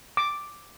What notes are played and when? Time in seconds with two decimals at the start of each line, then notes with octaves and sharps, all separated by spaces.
0.17 D6